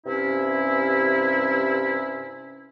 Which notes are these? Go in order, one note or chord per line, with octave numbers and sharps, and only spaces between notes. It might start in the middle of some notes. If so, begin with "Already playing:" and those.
G2 C3 C#4 E4